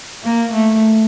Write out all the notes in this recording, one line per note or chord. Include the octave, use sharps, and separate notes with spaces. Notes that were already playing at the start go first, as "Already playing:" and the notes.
A#3
A3